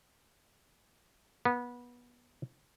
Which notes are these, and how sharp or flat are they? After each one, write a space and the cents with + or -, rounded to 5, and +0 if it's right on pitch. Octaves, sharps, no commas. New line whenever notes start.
B3 -20